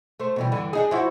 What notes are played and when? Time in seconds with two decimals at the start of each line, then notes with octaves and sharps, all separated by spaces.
0.20 A3 C5
0.36 B2 E3 G3
0.52 G2 D3 E3
0.73 D4 D#4 G#4
0.91 F3 E4 F#4